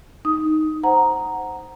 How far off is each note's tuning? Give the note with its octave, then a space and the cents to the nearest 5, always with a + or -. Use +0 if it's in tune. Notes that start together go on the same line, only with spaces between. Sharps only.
D#4 +0 D#6 +5
C5 +0 F#5 +0 A#5 +0